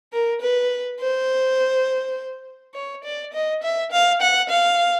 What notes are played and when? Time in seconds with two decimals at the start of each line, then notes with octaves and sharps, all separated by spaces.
0.13 A#4
0.41 B4
1.00 C5
2.74 C#5
3.04 D5
3.33 D#5
3.63 E5
3.92 F5
4.21 F#5
4.49 F5